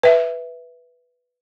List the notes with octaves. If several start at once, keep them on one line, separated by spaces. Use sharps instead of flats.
B4 E5